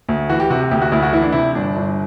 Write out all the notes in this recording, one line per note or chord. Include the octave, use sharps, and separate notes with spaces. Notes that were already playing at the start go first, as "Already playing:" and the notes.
D2
E3 F#4
G4
C3 F#4
G4
D2 G4
F#4
D2 E4
F#4
E3 E4
D4
C3 E4
G1 D4
G1